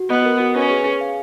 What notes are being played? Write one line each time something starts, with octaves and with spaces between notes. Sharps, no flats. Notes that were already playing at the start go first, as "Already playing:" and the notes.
Already playing: F#4
B3 D#5
A#4
F#4
C#4 B4
G#4
G#4
F5